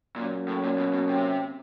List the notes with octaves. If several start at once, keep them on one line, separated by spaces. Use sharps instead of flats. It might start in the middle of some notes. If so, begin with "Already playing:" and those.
A#2 F#3 A#3 C#4
A2
A#2
B2
B2
C3